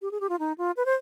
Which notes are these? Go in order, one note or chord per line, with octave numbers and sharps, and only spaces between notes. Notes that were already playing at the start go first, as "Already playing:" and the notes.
G4
G#4
G4
F4
D#4
F4
B4
C5